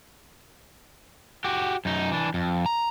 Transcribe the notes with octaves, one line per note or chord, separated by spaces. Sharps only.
F#4 G4
F#2 D#4
E3 D4
F2
A#5